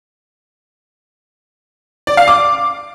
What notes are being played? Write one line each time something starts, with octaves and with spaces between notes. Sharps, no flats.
D5
F5
D6